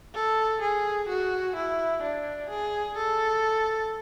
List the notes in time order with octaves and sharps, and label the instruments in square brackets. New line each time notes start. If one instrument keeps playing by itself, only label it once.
[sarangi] A4
G#4
F#4
E4
D4
G#4
A4